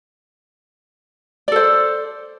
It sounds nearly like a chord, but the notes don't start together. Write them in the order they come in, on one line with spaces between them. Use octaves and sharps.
D5 A4 C5